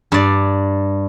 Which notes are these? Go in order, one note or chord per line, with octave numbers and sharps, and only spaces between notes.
G2 D5